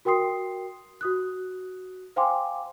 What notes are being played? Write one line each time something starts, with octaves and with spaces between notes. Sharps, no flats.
F#4 A#4 G5 C6 D#6 C7
F#4 D#6 F#6
C5 F5 G5 G#5 C6 D6